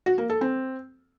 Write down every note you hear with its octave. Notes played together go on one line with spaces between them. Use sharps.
F#4
A#3
A4
C4